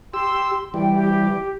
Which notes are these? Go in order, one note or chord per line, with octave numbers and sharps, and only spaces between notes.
G4 C6 E6
E3 G3 G5
G4